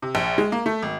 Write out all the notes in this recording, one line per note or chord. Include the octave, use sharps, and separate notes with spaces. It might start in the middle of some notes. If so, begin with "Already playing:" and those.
C3
A#1
G#3
A#3
A3
G#1